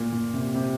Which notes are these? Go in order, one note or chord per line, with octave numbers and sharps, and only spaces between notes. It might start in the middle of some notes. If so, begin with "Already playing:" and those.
Already playing: A#2
A#2
C3
C3